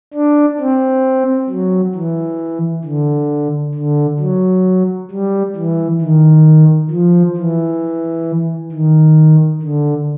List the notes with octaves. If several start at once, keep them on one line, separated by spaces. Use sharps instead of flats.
D4
C4
F#3
E3
D3
D3
F#3
G3
E3
D#3
F3
E3
D#3
D3